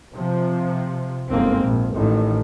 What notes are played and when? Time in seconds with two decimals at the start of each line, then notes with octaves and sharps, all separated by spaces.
0.13 C3 F3
1.30 G1 G#2 A#3 C4
1.64 A#1
1.93 A1 A2 D#3